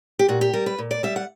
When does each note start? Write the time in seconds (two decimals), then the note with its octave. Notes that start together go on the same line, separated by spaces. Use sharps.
0.19 G4
0.28 A#2 F#4
0.41 G4
0.53 G3 A#4
0.66 B4
0.78 A#2
0.91 D5
1.03 G3 E5
1.16 F#5